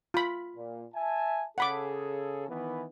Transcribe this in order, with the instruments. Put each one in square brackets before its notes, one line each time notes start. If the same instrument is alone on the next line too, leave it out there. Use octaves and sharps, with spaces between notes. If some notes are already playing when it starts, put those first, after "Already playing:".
[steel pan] F4 B5
[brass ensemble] A#2
E5 G#5 A5
[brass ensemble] C#3 G#4 A4 [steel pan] F#5 B5 D6
[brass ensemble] D#3 E3 B3